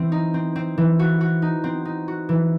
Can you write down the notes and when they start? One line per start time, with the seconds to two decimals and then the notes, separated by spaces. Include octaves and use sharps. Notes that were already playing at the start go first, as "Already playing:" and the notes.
Already playing: E3 C4
0.12 D#4
0.34 C4
0.56 C4
0.78 E3
0.99 F#4
1.21 F#4
1.42 D#4
1.64 C4
1.85 D#4
2.08 F#4
2.29 E3